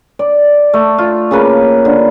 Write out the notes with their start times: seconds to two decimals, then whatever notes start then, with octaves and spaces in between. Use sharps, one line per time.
0.19 D5
0.74 A3
0.98 F4
1.31 C#3 A#3 B4
1.85 D3